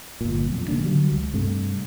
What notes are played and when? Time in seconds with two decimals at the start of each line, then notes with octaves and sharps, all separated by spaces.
0.21 G1 A#2
0.47 B1 F2
0.68 C#3 A#3 D4
0.84 D3 F#3 G3
1.12 C#2
1.34 G2 C3 A3